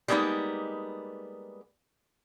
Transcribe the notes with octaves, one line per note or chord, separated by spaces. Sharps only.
G3 G#3 A#3 B3 D#4